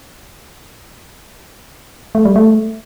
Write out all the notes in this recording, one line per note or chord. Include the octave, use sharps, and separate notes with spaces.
A3
G3
A3